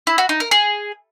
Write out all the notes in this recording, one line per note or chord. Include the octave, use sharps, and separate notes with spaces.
E4
F#4
D#4
A#4
G#4